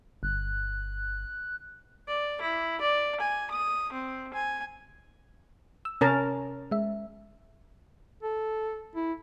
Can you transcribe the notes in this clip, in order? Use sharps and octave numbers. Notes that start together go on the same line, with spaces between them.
G1 F#6
D5
E4
D5
G#5
D#6
C4
G#5
E6
C3 C#4 A#4 A5
G#3 E5
A4
E4